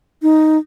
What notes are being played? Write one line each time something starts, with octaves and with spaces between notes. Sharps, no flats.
D#4